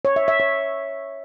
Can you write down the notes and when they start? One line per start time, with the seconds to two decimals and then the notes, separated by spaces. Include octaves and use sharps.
0.05 C#5
0.16 E5
0.28 E5
0.40 C#5